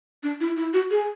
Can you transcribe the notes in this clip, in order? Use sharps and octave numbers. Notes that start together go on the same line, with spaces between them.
D4
E4
E4
F#4
G#4